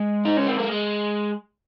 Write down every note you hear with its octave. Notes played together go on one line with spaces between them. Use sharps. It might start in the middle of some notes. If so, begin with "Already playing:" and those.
Already playing: G#3
D#4
C#4
C4
A#3
G#3